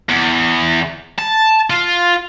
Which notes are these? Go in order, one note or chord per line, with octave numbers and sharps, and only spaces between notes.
E2
A5
F4